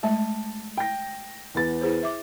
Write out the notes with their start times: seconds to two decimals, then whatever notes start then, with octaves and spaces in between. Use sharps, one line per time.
0.03 G#3 A3 E5 A5
0.77 G5 A#6
1.55 E2 B3 A6
1.81 E4 G#4 C5
2.03 E5 D6